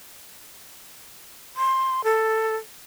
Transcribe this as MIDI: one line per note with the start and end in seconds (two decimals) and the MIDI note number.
1.56 2.04 84
2.04 2.56 69